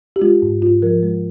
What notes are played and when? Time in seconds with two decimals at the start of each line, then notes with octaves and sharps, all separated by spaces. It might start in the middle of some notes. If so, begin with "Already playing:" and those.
0.16 G4
0.21 G#3 F4
0.42 G#2
0.62 G#2 F4
0.82 F3 A#4
1.03 G#3